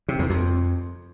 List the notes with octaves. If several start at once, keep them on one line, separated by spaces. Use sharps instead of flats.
C3
E2
F2